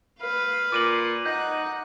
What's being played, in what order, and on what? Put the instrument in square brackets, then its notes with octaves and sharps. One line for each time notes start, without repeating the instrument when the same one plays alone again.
[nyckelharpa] B4 F5
[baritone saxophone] A#2 [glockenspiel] D6 D#7 F#7
[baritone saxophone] D#4 [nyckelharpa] F#5 [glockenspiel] G6